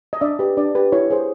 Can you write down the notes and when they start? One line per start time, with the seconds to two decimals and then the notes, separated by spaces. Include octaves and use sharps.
0.13 D#5
0.21 D4 D5 E5
0.39 G4 B4
0.57 D4 D5
0.75 G4 B4
0.92 E4 C#5
1.10 G#4 C5